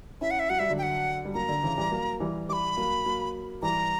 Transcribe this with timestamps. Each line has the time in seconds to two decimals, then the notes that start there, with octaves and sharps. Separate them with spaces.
0.21 C#4 E4 E5
0.31 F#5
0.39 E5
0.50 F#3 F#5
0.59 G3 E5
0.70 D3 F#3
0.78 G5
0.83 F#5
1.25 G3
1.34 F#3 A#3 A#5
1.49 D3
1.63 C#3 E3
1.78 E3 G3
1.92 F#3 A#3
2.20 E3 G3
2.49 E3 G3 B5 D6
2.77 F#3 A#3
3.06 F#3 A#3
3.62 E3 G3 A#5